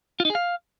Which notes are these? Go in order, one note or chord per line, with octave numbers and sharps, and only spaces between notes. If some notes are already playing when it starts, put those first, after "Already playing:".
F4
D#4
G#4
F5